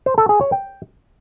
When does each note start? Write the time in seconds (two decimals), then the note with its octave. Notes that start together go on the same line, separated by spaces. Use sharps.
0.06 C5
0.18 A4
0.29 G#4
0.41 C#5
0.52 G5